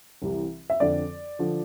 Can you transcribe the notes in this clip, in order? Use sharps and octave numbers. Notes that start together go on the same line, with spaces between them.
C2 C3 E3
E5
F2 D3 F3 D5
D3 F3